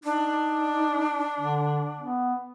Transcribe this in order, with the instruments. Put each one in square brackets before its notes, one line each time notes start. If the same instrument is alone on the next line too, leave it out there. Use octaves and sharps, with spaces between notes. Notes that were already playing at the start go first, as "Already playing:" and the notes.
[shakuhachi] D4 [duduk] D#4
[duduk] D3
B3